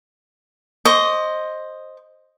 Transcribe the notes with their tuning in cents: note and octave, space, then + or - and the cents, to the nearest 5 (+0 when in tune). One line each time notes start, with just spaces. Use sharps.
C5 +10 D#5 +0 C#6 +40